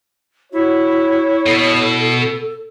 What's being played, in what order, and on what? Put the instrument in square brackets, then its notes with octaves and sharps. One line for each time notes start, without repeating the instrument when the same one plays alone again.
[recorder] E4 [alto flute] F#4 [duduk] C#5
[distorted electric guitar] B2 [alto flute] A4